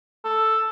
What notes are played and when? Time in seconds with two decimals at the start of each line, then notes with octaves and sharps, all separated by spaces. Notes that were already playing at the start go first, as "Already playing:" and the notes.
0.24 A4